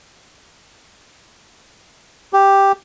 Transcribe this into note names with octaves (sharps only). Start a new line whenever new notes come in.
G4